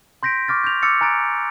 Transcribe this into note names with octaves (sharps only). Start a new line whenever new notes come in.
C6 G6 A#6 B6 D7
C#6 D6 F6 A6
G6 F7
D6 E6 F6 A6 C#7
G#5 A#5 F#6 A6 D7